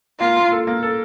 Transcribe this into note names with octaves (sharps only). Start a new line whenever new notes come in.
A#3 F4
A#3
A4
A#3
A4